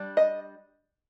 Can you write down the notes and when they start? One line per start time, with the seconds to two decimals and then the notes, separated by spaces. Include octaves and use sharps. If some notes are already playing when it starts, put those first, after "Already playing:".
Already playing: G3 D4
0.17 D#5